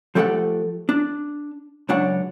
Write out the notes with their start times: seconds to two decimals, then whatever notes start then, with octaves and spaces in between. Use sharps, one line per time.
0.15 F3 A3 C4 G4 A4 F#5
0.89 D4
1.89 C#2 F#2 D4 C#5 F#5